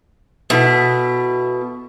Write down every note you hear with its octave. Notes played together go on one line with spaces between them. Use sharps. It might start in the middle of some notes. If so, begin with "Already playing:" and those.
B2 B3 E4 A4